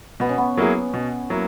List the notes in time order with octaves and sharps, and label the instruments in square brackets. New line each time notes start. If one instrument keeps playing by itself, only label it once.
[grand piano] B2 [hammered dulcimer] B3
[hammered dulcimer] C#4
B3
[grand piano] F#3 A#3 E4 G#4
B2
F#3 A#3 E4